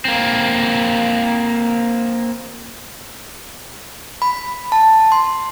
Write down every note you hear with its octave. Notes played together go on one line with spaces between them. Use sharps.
A#3 C4
B5
A5
C6